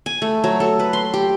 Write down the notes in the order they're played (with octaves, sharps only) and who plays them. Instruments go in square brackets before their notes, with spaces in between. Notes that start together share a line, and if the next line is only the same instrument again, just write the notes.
[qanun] G#5
A3
F#3
A4
B4
C6
G4